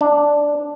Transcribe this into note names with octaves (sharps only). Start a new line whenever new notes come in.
D4